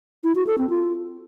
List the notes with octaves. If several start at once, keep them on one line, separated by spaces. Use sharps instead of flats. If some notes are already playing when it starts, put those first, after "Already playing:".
E4
F#4
A4
C4
F4